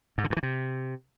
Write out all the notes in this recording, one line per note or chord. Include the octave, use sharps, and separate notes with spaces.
G#2
D3
G2
E3
C3